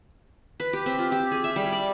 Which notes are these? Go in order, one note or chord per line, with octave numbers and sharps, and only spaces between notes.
B4
G4
C4
F4
G4
G#4
E5
G3
D5